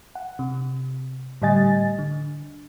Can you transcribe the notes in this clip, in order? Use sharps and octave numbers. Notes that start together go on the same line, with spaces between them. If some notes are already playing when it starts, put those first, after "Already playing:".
F#5
C3
A2 D3 G3 D#5 G#5 A6
D3